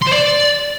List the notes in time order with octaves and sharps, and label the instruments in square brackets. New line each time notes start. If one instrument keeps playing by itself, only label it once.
[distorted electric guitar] C6
C5
D5